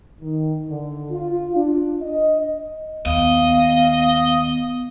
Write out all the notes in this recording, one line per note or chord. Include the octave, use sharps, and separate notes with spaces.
D#3
D3
F4
D4
D#5
D#2 B3 D#5 F5